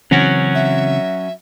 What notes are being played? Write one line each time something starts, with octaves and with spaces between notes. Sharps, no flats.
C#3 E3 F#3 C4 C#4 F#4
E5